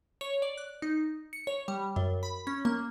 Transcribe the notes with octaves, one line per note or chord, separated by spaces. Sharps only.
C#5
D5
F#6
D#4
C#7
C#5
G3
F#2
B5
C#4
A#3